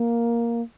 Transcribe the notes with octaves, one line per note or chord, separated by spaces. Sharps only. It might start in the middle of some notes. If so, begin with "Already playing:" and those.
Already playing: A#3